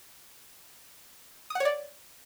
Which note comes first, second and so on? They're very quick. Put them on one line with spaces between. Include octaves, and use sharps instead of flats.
D#6 F#5 C#5 D5